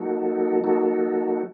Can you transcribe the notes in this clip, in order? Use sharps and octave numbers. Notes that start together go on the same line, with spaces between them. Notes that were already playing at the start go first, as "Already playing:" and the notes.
Already playing: F#3 A#3 D#4 F#4 A4
F#3 A#3 D#4 F#4 A4